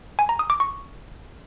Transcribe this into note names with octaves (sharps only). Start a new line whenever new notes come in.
G#5
A#5
D#6
D6
C#6